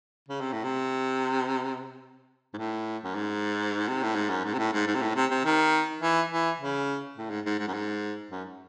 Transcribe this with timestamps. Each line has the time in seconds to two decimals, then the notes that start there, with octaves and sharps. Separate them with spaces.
0.29 C#3
0.41 C3
0.52 A2
0.64 C3
2.54 G#2
2.57 A2
3.04 F#2
3.15 G#2
3.88 C3
4.03 A2
4.16 G#2
4.30 F#2
4.45 G#2
4.54 C3
4.58 A2
4.73 G#2
4.87 G#2
4.95 C3
5.02 A2
5.16 C3
5.31 C3
5.45 D#3
6.02 E3
6.30 E3
6.59 C#3
7.17 A2
7.30 G#2
7.46 G#2
7.59 G#2
7.68 F#2
7.74 G#2
8.31 F#2